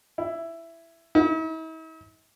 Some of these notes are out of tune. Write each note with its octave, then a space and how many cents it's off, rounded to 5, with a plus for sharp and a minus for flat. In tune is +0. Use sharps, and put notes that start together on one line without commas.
E4 +10
E4 -45